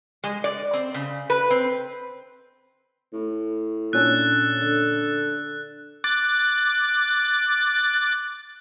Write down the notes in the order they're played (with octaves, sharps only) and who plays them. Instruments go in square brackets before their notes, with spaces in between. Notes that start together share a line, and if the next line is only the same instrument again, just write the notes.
[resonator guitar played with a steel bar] G#3
D5
C4
C#3
B4
C4
[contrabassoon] A2
[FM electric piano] A#2 C#4 D4 [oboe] A4 [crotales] F#6
[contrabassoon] D3
[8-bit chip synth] D6 F#6 A6